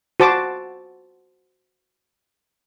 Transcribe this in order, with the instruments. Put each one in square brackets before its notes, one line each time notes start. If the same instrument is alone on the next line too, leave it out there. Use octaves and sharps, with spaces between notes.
[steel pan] F#4 C5 A5 D6